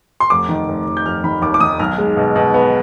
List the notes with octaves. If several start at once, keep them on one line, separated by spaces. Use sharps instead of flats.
C6
F1 D6
D#3
F1
F1
G6
F1 F6
D#3 B5
D#2 D6
D6
D#3 D#6
B1 F6
G#3
B2
B2
B3